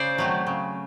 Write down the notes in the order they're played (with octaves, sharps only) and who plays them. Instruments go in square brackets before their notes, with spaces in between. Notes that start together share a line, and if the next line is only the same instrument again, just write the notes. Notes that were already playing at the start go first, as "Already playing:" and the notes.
Already playing: [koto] C#3 C5 D5
F#3 A3 C4
C#3